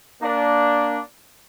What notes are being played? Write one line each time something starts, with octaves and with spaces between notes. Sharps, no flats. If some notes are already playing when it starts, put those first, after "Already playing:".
A#3 D4